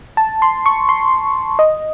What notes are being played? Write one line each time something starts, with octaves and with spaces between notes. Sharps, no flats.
A5
C6
C#6
C6
D#5